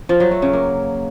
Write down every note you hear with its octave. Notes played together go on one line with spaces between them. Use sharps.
F3
F#3
A3
C#3
A#3